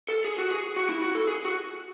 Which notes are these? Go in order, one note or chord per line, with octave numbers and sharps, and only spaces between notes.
A4
G#4
F#4
G#4
F#4
E4
F#4
A4
G#4
F#4